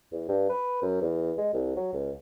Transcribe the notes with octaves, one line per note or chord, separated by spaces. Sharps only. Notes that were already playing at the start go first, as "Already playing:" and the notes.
E2
G2
B4
F#2
E2
G#3
C2
F#3
C#2